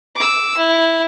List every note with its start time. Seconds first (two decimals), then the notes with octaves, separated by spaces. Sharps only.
0.16 D6 E6
0.58 E4